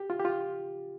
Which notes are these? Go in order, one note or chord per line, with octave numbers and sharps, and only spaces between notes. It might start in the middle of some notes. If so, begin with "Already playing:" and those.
Already playing: G4
F4
G4
F4